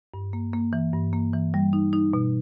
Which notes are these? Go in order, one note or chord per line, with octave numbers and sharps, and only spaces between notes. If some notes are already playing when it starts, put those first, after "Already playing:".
G2
A#3
A#3
E3
G2
A#3
E3
G3
D#4
D#4
B2